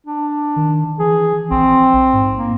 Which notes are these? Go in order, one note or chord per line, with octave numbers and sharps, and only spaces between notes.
D4
D#3
E3 G#4
A#1 C4
G#2
A#3